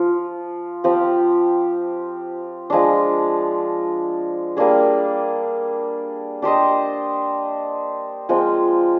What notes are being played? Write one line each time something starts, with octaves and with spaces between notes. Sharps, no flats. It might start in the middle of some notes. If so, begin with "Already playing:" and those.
Already playing: F3 F4
F3 C4 G4
F3 G#3 D4
G3 A#3 D4 G#4
D4 G4 C5 D#5
F3 G#3 C4